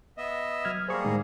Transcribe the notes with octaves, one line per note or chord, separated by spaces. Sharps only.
B3 D#5 E5
F#3 F6 G#6
G3 A#3 G#4 C5 C#6
A2 D#3 G#3